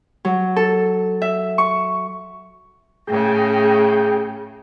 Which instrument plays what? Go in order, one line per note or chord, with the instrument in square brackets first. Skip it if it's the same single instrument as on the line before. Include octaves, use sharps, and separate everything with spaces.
[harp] F#3
A4
E5
C#6
[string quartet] A2 C#3 [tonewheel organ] G#4 G5